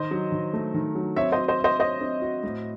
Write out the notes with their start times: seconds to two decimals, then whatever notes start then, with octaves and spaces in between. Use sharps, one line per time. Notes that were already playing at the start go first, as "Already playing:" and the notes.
Already playing: D#3 C5 D#5
0.11 F#3
0.32 D#3
0.53 A3
0.74 D#3
0.95 F#3
1.16 C4 C#5 E5
1.32 C5 D#5
1.38 F#4
1.48 C5 D#5
1.59 E5
1.64 C5 D#5
1.80 C5 C#5 D#5
2.01 C4
2.22 F#4
2.43 A2